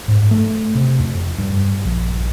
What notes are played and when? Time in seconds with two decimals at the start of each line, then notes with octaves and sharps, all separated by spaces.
0.08 G#2
0.31 A3
0.75 C3
1.00 F2
1.38 G2
1.85 A#1